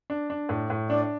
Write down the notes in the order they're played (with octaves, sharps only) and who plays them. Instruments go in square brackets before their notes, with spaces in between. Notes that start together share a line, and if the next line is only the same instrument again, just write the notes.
[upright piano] D4
D4
A2
A2
[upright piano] D4 [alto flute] D5